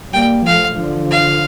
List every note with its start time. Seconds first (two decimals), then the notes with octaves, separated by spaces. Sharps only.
0.13 G3 A#3 G5
0.46 F3 A3 F5
0.78 D3 F3
1.11 F5